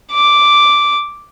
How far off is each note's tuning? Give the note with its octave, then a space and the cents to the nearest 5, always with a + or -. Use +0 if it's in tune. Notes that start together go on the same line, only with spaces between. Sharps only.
D6 +0